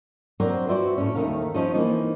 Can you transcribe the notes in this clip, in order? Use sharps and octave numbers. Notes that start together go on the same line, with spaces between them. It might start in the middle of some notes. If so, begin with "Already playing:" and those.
F#3 C4 D4 A#4 C5
F#4 B4 C5 D5 E5
A2 C#4
D#2 D#3 A3 A#4 F5
F3 C#4 D#4 G4 D#5
E3 A#3 C4 D#4 F4